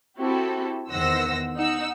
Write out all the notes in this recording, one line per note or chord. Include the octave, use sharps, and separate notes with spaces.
C4 E4 F#4 G4 A4
E2 D#3 C5 F#5 E6 A#6
D#4 F#5 E6